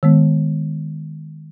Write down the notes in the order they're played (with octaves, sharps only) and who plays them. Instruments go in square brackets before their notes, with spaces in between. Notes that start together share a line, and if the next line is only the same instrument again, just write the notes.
[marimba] D#3 G#3 B3